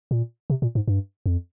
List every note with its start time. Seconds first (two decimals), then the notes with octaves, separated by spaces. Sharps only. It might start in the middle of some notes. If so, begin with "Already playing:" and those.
0.11 A#2
0.50 C3
0.62 A#2
0.75 G#2
0.88 G2
1.26 F2